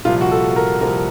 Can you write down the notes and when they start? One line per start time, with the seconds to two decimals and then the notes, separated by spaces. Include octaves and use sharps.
0.05 C2 A#2 F3 F4
0.21 F#4
0.31 A4
0.56 A#4
0.81 C2 A#2 F3 A#4